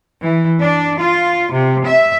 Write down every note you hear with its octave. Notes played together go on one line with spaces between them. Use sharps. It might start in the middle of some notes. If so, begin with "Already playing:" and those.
E3
D4
F4
C3
E5